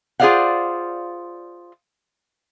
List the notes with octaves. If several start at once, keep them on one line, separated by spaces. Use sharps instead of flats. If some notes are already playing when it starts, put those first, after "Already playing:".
F4 G#4 C5 D5 F5 F#5